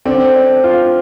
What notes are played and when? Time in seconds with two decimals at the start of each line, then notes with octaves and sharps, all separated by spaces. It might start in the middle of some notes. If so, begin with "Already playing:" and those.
0.05 D3 C4
0.35 D4
0.64 F4